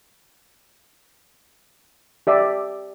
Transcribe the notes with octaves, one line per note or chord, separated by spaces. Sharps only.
G4 D5 E5